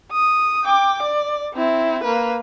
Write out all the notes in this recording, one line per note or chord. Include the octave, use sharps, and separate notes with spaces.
D#6
G5 D6
D5
C4 E4
A#3 B4